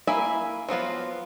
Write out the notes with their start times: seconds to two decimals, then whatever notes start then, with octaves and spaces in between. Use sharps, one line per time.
0.07 A#3 E4 E5 G#5 B5
0.69 F3 F#3 B3 F4